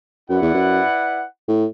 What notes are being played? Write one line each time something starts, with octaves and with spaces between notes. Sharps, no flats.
F#2 E4 B4 D5 F#5
E2
F#2
A2